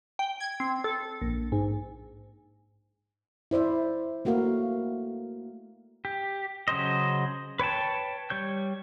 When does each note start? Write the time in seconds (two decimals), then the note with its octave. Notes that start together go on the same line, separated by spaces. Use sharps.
0.19 G5
0.40 G#6
0.60 C4
0.84 A4
1.22 A#1
1.52 G#2
3.51 E4 C5 D5 E5
4.25 A3 A#3 F#4 A#4 F5
6.05 G4
6.68 C#3 F#3 C5 D#5
7.59 B4 C#5 G5 A5
8.30 G3 C#5 G6